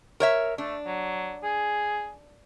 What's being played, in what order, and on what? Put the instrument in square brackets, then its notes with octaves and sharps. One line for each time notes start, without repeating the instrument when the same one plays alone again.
[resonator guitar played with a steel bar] A#4 C#5 E5
[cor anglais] A3 [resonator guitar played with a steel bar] D4
[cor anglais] F#3
G#4